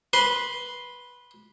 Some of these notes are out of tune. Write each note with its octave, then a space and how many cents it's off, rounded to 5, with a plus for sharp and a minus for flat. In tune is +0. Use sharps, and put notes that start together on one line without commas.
B4 -10 C6 +0